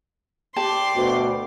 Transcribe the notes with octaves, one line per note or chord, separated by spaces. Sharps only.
G4 D5 A5 C6 D6
D2 B2